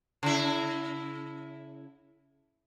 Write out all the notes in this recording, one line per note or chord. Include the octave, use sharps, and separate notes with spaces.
C#3 E4